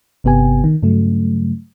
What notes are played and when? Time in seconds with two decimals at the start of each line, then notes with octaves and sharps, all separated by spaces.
0.24 G1 C3 B3 G4 G#5
0.64 D#3
0.83 G2 C#3 F#3 A3